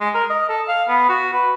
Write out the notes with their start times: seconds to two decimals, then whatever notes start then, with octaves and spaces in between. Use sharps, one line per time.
0.01 G#3
0.14 A#4
0.30 D#5
0.49 A4
0.68 F5
0.89 B3
1.09 F#4
1.33 B4